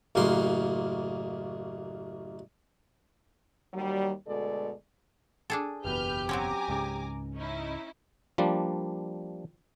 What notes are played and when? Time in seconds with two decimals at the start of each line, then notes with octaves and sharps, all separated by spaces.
0.15 A1 F#2 C#3 A#3 C6
3.74 D#2 F#3 G3
4.27 D2 B2 G#3 A4 D5
5.50 D4 G#4 A4
5.85 F#1 E2 B2 G4 B4 F6 G6
6.29 F#3 C4 C#4 G#5 A#5 D6
6.68 C#2 G#2 C#3
7.37 C#4 D#4 E4
8.38 F3 G3 A#3 D4